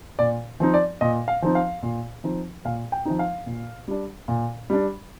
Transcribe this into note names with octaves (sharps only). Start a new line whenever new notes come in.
A#2 D5
F3 C4 D#4
D5
A#2 D#5
F5
F3 C4 D#4
F5
A#2
F3 C4 D#4
A#2 F5
G5
F3 C4 D#4
F5
A#2
G3 D4
A#2
G3 D4